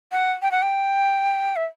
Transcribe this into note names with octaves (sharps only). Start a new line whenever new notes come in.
F#5
G5
F#5
G5
E5